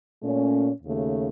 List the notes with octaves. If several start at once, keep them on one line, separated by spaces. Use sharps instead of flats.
A#2 A3 C#4
D#2 C#3 A3